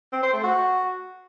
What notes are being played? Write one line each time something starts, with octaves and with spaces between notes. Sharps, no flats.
C4
C5
A3
F#4